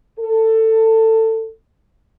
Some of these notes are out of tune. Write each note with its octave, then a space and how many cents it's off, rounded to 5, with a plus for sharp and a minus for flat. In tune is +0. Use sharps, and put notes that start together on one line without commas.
A4 +20